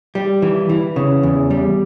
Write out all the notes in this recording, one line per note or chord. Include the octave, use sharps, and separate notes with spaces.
G3
E3
E3
C#3
E2
G3